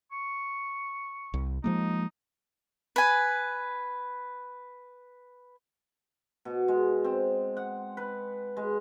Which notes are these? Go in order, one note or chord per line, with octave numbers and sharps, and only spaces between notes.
C#6
C2
F3 G#3 A#3 D#4
B4 G#5
B2
G#3
C4
F#5
B4
G#3